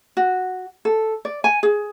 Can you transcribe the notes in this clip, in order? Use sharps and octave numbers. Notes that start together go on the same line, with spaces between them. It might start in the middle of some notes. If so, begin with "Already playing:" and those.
F#4
A4
D5
G#5
G#4